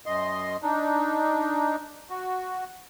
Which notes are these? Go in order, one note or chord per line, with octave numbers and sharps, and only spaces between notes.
F#2 D#5 C6
D4 D#4
F#4